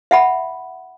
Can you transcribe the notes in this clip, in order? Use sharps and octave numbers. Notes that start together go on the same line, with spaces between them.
E5 F#5 B5